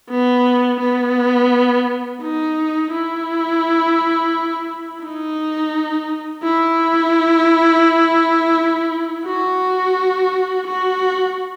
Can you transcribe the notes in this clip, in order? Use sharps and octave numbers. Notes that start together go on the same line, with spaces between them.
B3
B3
D#4
E4
D#4
E4
F#4
F#4